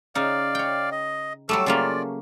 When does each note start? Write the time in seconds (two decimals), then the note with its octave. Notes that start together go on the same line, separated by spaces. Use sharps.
0.15 C#3 D#4 D5 F5
0.55 C#5 G5
0.92 D#5
1.49 F#3 G3 A3 A4 D6 E6
1.66 C#3 A3 A#3 F4 D5